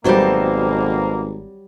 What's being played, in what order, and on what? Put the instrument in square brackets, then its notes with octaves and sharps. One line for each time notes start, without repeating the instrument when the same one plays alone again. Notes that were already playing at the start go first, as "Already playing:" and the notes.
[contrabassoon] G#1 [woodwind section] B2 A#3 [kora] F#3 G3 [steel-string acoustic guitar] A4 C5 A5